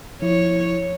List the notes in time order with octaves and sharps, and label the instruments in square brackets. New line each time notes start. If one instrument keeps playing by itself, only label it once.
[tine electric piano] F3 E4 [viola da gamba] C#5